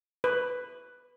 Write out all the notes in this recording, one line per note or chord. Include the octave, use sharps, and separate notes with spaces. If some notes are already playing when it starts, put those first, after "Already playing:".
B4